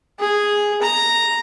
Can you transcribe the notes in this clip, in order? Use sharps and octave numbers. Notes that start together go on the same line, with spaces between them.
G#4
A#5